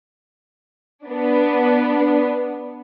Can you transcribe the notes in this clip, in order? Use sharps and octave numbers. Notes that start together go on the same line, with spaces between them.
B3 D4